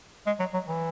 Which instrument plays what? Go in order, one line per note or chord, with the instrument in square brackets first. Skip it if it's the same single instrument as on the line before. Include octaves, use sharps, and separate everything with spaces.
[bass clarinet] G#3
F#3
F#3
E3